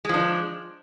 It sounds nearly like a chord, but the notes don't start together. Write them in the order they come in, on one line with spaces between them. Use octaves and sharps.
G#3 F3 D4